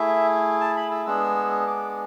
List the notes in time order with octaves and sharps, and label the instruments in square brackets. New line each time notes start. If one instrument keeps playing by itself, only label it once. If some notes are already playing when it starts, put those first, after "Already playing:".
Already playing: [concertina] A3 E4 G#4 E5
A5
B5
E6
G#3 B3 D4 G#4 E6
D6